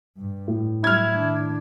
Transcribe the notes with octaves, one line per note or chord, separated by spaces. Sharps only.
G2
A2
F#3 G3 E4 F6 G#6
D#3 D4